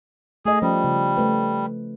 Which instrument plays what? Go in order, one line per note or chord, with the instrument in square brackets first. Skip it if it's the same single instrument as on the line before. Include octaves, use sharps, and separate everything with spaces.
[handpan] A3 D#5 [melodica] G#4
[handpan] F3 C#4 [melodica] G3
[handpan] C#3
A3 B4